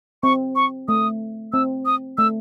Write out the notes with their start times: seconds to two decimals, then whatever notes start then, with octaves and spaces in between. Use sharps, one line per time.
0.23 C4 C#6
0.56 C#6
0.88 A3 D#6
1.53 C4 E6
1.86 D#6
2.18 A3 E6